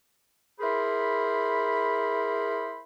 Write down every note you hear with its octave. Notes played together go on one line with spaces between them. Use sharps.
E4 G#4 A#4 C5 B5